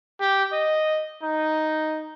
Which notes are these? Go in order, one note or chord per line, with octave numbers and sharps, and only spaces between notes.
G4
D#5
D#4